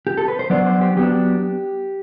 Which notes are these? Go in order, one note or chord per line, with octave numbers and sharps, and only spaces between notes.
G4
A4
B4
C5
F#3 B3 D4 D5
C5
G4
F#3 B3 D4 G4